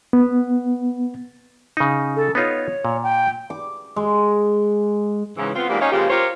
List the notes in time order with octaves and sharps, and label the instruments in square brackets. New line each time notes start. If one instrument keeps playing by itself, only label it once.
[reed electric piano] B3
[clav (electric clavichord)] C#3 D#4
[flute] A4
[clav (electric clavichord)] B3 D#4 F4 [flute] C#5
[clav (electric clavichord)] A#2
[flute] G5
[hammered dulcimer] D6
G#3
[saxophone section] G#2 C#3 E3
B3 C4 F4
G#2 E3 G3 A#3 G4
C#4 D#4 G4 C#5 D#5 F5
C#3 F3 G#3 A#3 G4
F4 G4 A#4 C5 C#5